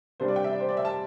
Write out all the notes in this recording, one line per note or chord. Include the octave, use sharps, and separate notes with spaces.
C3 G3 D4 C5
D5
G5
E5
D5
C5
D5
E5
A5